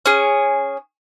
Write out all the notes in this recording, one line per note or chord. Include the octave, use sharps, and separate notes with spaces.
C#4 G#4